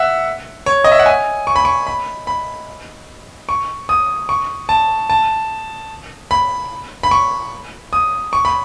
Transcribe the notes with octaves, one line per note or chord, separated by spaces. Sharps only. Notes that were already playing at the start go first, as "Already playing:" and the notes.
Already playing: E5 F#5
C#5
D#5
E5
F#5
G#5
C#6
B5
C#6
B5
B5
C#6
D#6
C#6
A5
A5
B5
B5
C#6
D#6
C#6
B5